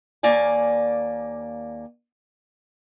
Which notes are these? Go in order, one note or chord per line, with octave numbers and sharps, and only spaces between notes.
D#2 A#3 D5 G#5